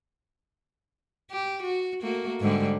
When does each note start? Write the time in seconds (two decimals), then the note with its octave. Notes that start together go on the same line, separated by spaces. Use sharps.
1.31 G4
1.63 F#4
2.01 A3 A#3 F#4
2.40 G#2 D3 G3